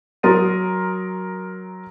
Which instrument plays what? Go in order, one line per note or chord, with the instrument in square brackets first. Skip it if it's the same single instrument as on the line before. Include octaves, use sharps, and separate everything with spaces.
[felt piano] F#3 A#4 C6 D#6 A6 D#7